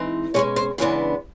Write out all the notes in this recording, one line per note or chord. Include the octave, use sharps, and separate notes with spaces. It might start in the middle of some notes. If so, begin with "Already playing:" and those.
Already playing: E3 G#3 C4 D#4
B2 G#3 C#4 C#5
C5
C#3 E3 G#3 B3 D4 C#5